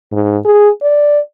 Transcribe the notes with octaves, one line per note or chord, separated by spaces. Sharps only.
G#2
G#4
D5